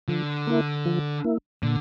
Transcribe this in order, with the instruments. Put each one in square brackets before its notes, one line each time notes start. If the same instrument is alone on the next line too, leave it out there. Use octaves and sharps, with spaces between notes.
[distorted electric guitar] D3 [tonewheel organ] F3
[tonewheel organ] A#3 E4
F3
A#3 E4
[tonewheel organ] A#2 [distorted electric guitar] D3